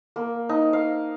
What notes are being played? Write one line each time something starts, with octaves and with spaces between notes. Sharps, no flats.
A#3
D#4
F5